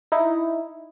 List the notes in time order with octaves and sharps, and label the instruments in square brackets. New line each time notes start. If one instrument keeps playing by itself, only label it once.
[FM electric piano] D#4 E4